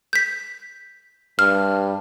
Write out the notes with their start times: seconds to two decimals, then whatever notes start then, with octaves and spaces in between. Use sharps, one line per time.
0.13 G6 B6
1.39 G2 F6